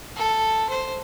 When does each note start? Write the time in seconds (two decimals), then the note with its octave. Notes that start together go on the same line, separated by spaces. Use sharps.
0.16 A4
0.70 C5